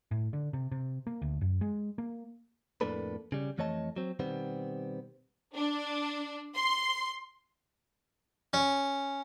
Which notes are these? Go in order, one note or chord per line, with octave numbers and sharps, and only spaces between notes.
A2
D3
C3
C3
A#3
D2
F#2
G#3
A#3
F2 A2 A#3 D4 A4 B4
C#3 G3
F2 E3 A3 C#5 D#5 A5
F#3 C4
B2 D#3 G3 B3 C4
D4
C6
C#4